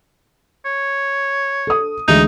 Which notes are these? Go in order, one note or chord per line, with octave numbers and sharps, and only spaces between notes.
C#5
A4 D#6
D2 E3 G#3 D#4